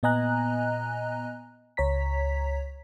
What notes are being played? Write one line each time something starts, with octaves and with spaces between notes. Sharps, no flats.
A#2 B3 D#5 G#5 A#5 F#6
C#2 C#5 A#5 B6